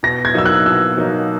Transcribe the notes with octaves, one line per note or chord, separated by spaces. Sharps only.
B2 A#6
G#6
F#3 A#3 D#4 E6
F#6
B2 E6
F#3 A#3 D#4